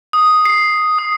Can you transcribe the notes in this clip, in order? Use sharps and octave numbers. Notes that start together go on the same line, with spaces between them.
D#6
C7
D#6